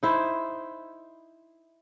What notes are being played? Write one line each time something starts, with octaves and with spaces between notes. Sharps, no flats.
D#4 E4 C5